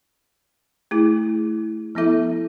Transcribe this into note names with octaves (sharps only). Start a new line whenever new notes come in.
A3 E4 G#4
F3 B3 E4 A4 E5